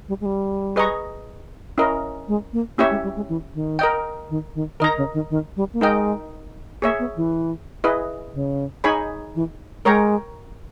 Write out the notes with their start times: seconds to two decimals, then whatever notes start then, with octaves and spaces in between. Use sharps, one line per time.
0.08 G3
0.21 G#3
0.25 G3
0.76 G#4 B4 D#5 A#5 C#6
1.78 C#4 E4 A#4 D#5
2.28 G#3
2.53 A#3
2.78 A#3 C#4 E4 G4 C#5 E5
2.90 G#3
3.03 G3
3.16 G#3
3.29 E3
3.54 D#3
3.79 A#4 D#5 G5
4.30 D#3
4.55 D#3
4.80 D#3 A#4 D#5 A#5
4.97 C#3
5.14 D#3
5.30 D#3
5.56 G3
5.73 A#3
5.81 G#3 D#4 A#4 D#5 G5
6.82 A#3 G#4 C#5 E5
6.99 B3
7.16 E3
7.84 E4 G#4 B4 D#5
8.34 C#3
8.84 D#4 G#4 C#5 G#5 B5
9.35 E3
9.85 G#3 A#4 C#5 G5 A#5